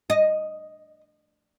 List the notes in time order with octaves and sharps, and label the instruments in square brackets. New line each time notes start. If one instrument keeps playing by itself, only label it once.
[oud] D#5